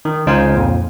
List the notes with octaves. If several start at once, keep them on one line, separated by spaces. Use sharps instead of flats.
D#3
C#2 D#4 C5 F5 G#5
F2 A#2